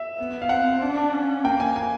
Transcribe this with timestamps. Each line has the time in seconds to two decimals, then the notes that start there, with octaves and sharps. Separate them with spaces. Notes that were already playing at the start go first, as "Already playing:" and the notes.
Already playing: E5
0.18 B3
0.42 F5
0.49 C4 F#5
0.82 D4
1.12 C#4
1.44 A#3 G5
1.60 G#5
1.76 G#5